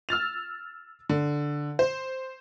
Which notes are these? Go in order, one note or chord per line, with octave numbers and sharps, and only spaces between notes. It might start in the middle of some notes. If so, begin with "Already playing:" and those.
E6 F6 A6 F7
D3
C5